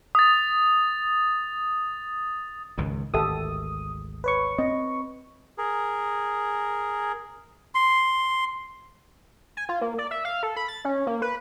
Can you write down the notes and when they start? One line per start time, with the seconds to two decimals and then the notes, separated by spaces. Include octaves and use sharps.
0.15 D#6 A6
2.78 C#2 G#2 D#3
3.14 G#1 D2 G4 A4 E5 D#6
4.24 B4 C#5 C#6
4.58 C4 D#5
5.58 G#4 A#4
7.75 C6
9.57 G#5
9.69 F4
9.81 A#3
9.98 D5
10.11 E5
10.25 F5
10.43 A4
10.56 B5
10.68 A6
10.85 C#4
11.07 A#3
11.22 B4